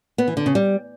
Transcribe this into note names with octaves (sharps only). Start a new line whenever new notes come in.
B3
E3
D3
C#3
G3